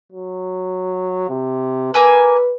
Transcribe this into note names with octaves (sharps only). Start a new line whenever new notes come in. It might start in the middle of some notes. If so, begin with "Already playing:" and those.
F#3
C3
A#3 B4 G#5 E6